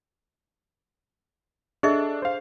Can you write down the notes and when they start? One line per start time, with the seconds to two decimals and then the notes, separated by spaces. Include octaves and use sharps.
1.83 D4 G#4 A4 D#5 E5
2.22 C5 F5